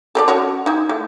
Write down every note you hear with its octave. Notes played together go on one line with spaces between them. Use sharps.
A4 A#4 D5
C#4 F#4 C#5
D#4 E4
A3